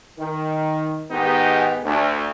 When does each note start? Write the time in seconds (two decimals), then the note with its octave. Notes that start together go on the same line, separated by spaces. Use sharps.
0.19 D#3
1.11 G#2 D#3 B3 D#4 G4 G#4
1.84 D2